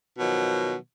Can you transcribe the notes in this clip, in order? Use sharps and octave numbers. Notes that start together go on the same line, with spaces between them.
B2 D#3 F3 F#3